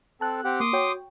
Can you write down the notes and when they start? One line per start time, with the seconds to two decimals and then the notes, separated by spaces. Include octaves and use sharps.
0.21 C4 A4 A5 F#6
0.44 C4 G4 F#5
0.60 A#3 C6 D6 D#6
0.73 F#4 C#5 G5